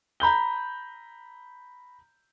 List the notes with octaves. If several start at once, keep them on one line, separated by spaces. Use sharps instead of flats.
A#5 B5 G6 G7